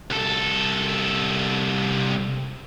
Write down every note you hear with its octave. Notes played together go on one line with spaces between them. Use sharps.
C2 A4